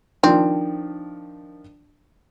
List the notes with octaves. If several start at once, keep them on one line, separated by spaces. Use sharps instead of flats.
D#3 F3 C4 D4